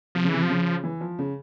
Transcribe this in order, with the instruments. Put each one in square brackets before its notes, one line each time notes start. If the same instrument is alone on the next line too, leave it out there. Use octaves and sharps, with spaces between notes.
[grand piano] C3 [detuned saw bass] F3
[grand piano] C#3
[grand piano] C3 [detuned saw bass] E3
[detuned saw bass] F3
[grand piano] C#3
E3
F3
C#3